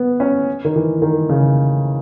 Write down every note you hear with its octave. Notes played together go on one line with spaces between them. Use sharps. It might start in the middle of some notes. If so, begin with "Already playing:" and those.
Already playing: B3
C#4
D#3
E3
D#3
C#3